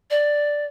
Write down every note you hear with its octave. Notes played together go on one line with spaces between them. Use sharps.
D5